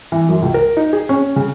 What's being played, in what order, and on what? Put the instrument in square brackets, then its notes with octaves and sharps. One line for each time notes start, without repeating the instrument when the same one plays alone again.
[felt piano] E3
F#2
C#2
A#4
D#4
G#4
C#4
C#3